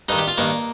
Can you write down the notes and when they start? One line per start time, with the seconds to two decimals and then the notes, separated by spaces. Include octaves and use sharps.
0.09 G2 D#3 D#4
0.18 G4
0.28 F4
0.38 G2 D#3 A#3